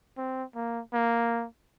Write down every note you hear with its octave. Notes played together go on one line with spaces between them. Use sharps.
C4
A#3
A#3